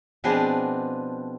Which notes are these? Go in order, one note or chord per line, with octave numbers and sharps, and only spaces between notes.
B2 F3 B3 C4 D4 G#4